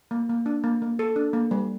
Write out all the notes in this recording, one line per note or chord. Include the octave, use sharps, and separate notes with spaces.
A#3
A#3
D4
A#3
A#3
A4
D4
A#3
G3